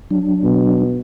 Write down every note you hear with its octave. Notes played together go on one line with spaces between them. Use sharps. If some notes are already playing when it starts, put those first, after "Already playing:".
F#3 D4
B2